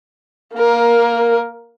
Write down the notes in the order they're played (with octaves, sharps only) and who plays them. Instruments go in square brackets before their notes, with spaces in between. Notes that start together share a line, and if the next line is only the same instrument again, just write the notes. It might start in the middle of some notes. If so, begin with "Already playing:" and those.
[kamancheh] A#3 A#4